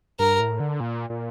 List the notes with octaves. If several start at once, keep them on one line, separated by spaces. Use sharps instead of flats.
G2 A#4
A2
D3
A#2
A#2